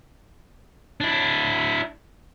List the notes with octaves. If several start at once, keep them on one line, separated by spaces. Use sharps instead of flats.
D4 E4